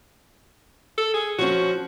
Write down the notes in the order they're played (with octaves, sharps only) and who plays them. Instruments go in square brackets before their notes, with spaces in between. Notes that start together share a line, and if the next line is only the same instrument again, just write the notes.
[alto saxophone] A4
G#4
[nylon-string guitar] F3 C#4 [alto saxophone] F#4